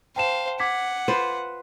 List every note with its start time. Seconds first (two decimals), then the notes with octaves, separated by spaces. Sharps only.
0.16 C5 F5 G5 A5 E7
0.60 F#5 D6 G#6 B6
1.08 F4 B4 C5